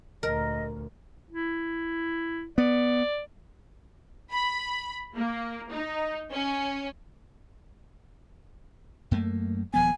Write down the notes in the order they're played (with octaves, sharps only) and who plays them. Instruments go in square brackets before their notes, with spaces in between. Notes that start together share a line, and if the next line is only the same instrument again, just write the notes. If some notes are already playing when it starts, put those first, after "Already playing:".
[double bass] D2 A#2 [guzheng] A#4 [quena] D#5
[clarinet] E4
[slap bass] B3 [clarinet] D5
[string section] B5
A#3
D#4
C#4
[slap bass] F#2 A3 A#3
[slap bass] D#1 F3 B3 [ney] G#5